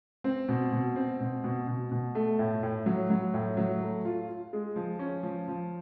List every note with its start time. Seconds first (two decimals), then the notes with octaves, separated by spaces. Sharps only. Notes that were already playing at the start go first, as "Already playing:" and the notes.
0.24 C4
0.49 B2
0.72 B2
0.96 C4
1.21 B2
1.44 B2
1.68 B2
1.92 B2
2.15 A3
2.39 A2
2.63 A2
2.86 F#3
3.10 F#3
3.34 A2
3.57 F#3
3.82 A3
4.05 F4
4.28 F4
4.53 G#3
4.76 F3
4.99 C#4
5.23 F3
5.48 F3